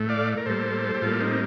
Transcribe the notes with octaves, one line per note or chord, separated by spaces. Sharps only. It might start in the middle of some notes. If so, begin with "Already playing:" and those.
Already playing: A2 A3
D5 F5
A#4
A2 G3 A#3 A4 C5
G4
A2 G3 A#3 F4 A4
C4 D#4